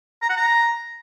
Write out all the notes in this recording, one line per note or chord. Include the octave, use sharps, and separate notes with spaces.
A#5
F#5
A#5